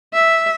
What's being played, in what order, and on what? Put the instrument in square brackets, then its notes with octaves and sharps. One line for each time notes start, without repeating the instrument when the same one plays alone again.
[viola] E5